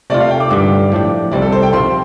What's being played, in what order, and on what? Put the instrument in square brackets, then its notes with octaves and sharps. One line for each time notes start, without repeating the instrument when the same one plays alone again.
[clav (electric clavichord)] C3 A3 F4 [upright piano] D5
[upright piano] F5
G5
D6
[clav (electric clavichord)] G2 D3 G3 [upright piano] D6
[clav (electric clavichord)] A2 F3 D4 G4
[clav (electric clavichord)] C2 C3 G3 C4 [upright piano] D5
[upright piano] A4
C5
G5
[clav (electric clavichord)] C3 F3 C4 F4 [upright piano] C6